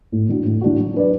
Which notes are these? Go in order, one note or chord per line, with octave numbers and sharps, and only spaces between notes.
A2
E3 D4 F#4
A2
E3 D4 F#4
F#3
D4 B4 D5